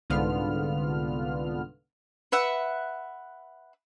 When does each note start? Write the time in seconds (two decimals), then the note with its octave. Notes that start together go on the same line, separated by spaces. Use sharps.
0.10 C2 G#2 D3 B3 F4 F6
2.32 B4 E5 F#5